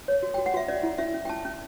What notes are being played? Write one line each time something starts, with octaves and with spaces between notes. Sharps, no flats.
C#5
F#4
F#4 G5
F#5
F#4 E5
C#4 D5
E4
C#4 E5
C#4
G5
C#4 A5
C#4